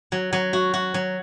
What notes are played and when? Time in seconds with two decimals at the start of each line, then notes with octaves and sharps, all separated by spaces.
0.12 F#3
0.33 F#3
0.53 F#4
0.74 F#4
0.94 F#3